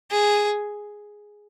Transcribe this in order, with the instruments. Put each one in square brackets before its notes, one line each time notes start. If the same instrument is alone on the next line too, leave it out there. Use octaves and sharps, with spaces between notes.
[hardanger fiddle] G#4